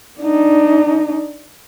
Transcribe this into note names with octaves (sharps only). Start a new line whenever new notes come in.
D4 D#4